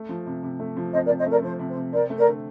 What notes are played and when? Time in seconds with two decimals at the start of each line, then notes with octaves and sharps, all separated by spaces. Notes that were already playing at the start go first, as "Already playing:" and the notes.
Already playing: A3
0.09 F3
0.26 C3
0.43 C3
0.60 A3
0.77 F3
0.92 C3 C5 D#5
1.05 A#4 D5
1.09 C3
1.18 C5 D#5
1.26 A3 A#4 D5
1.42 F3 C5
1.59 C3
1.68 C5
1.76 C3
1.93 C4 A#4 D5
2.10 A3
2.18 A#4 D5
2.27 D3